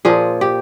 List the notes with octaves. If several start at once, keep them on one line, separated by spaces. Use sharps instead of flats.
A#2 F3 G#4
G4